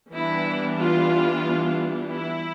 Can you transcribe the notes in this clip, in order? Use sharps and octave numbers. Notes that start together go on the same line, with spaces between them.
E3 G3 B3 D4 E4
F4
E4